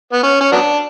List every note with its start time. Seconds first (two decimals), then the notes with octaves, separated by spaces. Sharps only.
0.13 B3
0.23 C#4
0.41 C#4
0.52 F#3 B3 D4